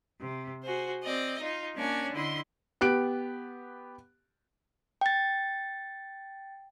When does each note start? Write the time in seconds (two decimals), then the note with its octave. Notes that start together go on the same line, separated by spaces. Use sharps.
0.20 C3
0.64 F#4 G#4 C5
1.03 C4 D5 D#5
1.40 D#4 F4
1.76 A#3 C#4 D4 C#5 G#5
2.13 D3 E4 D#5 C6
2.81 B3 G4 F#6 D7
5.01 G5 A6